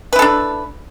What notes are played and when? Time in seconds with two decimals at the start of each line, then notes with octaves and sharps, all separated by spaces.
0.13 B4
0.16 E4
0.19 A4
0.22 D4